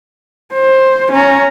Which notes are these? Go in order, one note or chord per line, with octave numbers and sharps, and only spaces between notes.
C5
C#4 A#5